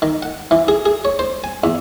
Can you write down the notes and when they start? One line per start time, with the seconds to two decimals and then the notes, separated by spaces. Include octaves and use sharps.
0.02 D#3
0.22 F#5
0.51 E3
0.68 G#4
0.86 G#4
1.05 C#5
1.19 C5
1.44 G#5
1.64 E2